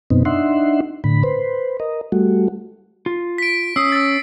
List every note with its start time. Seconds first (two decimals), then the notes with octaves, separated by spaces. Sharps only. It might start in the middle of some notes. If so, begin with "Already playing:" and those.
0.10 F#2 B2 B3 C4 D#4
0.25 D4 D#4 E5 F#5 C6
1.04 A2 D3 B5
1.23 B4 C5
1.80 A#4 D#5
2.12 G3 A3 F#4
3.06 F4
3.38 B6 D7
3.76 C#4 D#6 E6 C7
3.92 E6 A6